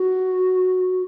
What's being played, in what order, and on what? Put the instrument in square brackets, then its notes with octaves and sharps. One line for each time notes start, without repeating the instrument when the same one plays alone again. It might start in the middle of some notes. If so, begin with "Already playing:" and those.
Already playing: [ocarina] F#4